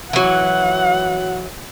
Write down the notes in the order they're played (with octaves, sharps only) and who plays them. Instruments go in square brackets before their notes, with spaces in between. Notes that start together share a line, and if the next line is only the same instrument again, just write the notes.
[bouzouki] E3 F#3 [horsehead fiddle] F#5